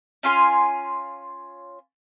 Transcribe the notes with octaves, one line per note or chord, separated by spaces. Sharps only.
C#4 F4 G#5 C6